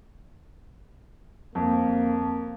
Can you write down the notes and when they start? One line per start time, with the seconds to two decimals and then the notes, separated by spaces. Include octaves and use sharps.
1.55 F2 A#3